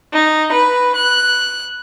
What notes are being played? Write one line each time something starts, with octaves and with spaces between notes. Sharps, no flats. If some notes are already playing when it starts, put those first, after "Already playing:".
D#4
B4
F#6